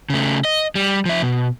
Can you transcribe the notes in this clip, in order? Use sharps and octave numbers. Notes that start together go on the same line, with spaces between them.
C#3 A3
D#5
G3
F3 E5
B2